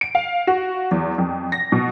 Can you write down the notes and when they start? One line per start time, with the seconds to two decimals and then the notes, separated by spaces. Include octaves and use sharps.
0.01 D7
0.15 F5
0.47 F#4
0.91 E2
1.18 F2
1.52 A#6
1.72 B2